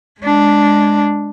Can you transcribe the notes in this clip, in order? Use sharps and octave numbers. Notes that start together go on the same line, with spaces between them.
G#3 D4